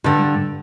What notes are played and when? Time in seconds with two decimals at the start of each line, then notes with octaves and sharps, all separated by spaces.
0.04 G2 D3 G3